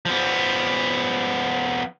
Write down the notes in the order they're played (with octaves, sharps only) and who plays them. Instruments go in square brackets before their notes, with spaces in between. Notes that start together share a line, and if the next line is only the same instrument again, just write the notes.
[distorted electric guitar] F3 B3